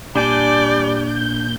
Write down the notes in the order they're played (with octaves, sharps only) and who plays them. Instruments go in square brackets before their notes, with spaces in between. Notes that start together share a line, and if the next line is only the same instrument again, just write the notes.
[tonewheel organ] A#2 G6 [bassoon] G3 [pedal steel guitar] D4 G#5 A5 [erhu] D5